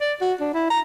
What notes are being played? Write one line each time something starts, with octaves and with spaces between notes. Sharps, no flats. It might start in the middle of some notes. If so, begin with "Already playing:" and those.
D5
F#4
D4
E4
A#5